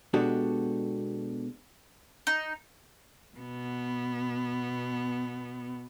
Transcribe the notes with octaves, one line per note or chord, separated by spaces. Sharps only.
B2 G#3 D4 F#4 G4 A4
D#4
B2 B3